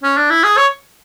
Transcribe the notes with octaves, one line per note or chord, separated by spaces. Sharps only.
C#4
D4
E4
G#4
C#5